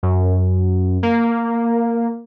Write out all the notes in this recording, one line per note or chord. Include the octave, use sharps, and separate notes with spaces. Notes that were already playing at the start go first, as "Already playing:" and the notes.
F#2
A#3